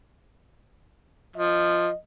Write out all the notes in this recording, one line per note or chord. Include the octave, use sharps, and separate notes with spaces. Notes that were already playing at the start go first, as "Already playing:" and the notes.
F3 D#5